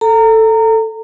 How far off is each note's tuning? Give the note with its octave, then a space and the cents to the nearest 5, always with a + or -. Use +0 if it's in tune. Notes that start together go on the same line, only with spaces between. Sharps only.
A4 +5 A#5 -20